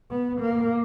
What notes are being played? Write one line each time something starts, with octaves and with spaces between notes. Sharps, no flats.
B3
A#3